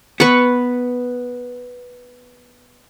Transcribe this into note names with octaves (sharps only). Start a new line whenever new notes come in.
B3 B4 C#6